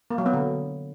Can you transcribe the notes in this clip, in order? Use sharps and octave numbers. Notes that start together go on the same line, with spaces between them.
A#3
F#3
B3
D3